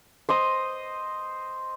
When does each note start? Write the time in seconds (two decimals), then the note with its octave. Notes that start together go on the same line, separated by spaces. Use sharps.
0.29 C5 D#5 D#6